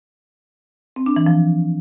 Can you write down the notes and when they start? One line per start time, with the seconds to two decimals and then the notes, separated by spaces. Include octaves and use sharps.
0.96 C4
1.06 D4
1.16 E3
1.26 F3